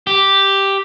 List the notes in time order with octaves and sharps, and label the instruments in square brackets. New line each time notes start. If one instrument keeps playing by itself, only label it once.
[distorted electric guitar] G4